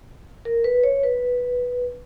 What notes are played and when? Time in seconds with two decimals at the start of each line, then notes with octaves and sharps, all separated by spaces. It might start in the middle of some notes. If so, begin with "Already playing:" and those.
0.45 A#4
0.64 B4
0.83 C#5
1.03 B4